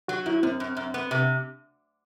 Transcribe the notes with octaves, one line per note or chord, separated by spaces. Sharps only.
F#3 F#4
F#2 E4
F#2 C4
F#2
F#2
B3
C3